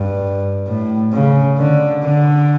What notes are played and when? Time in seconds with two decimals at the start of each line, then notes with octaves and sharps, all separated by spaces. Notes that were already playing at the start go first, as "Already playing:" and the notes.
Already playing: G2
0.67 A2
1.12 C#3
1.58 D3
2.03 D3